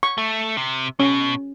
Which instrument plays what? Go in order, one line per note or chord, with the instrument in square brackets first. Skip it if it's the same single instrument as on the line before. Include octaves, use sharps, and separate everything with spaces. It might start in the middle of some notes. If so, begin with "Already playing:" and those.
[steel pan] C#6
[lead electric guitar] A3
C3
[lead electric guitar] B2 [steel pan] C#4